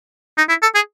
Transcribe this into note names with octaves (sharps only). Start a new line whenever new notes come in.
D#4
E4
A4
G#4